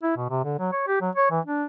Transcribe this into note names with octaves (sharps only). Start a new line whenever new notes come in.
E4
B2
C3
D3
F#3
C#5
G4
F#3
C#5
E3
D4